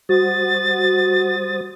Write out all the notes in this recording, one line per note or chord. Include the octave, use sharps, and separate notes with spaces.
G3 F#4 C5 D#6 A6